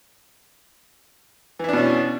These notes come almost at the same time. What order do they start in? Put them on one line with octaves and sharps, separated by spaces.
E3 E4 D4 B2 C#4